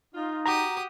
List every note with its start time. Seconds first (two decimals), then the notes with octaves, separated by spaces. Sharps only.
0.14 D#4 F4
0.46 F#4 G4 A#5 D#6